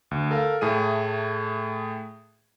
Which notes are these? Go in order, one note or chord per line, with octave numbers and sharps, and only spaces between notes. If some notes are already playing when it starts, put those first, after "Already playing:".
D2
A4 A#4 F5
A2 A3 G#4 D#7